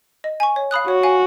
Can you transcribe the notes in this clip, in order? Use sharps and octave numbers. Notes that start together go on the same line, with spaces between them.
D#5
G#5 C#6
C#5
F5 B5 D#6 F#6
F#4 C#5
F5 G#5